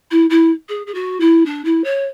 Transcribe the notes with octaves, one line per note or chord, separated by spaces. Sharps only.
E4
E4
G#4
G#4
F#4
E4
D4
E4
C#5